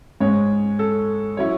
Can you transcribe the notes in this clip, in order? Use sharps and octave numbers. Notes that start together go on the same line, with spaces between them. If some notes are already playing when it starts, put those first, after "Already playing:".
G#2 G#3 C#4 C#5
A4
F#3 C#4 E4 C#5